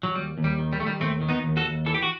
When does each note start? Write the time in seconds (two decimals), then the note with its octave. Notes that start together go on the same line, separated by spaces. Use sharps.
0.03 F#3
0.15 D#2 G3
0.38 D#2
0.44 G3
0.59 D#3
0.73 G3
0.80 D#3 A3
0.87 G3
1.00 D#2 A3 C4
1.22 D#3
1.29 B3 D#4
1.44 D#2
1.57 F#4 A4
1.65 D#2
1.86 E3 A4
1.94 G4
2.03 F#4